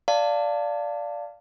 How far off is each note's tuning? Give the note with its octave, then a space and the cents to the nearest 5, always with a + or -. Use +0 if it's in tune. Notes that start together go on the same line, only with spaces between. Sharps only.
D5 -5 F5 +0 A5 +20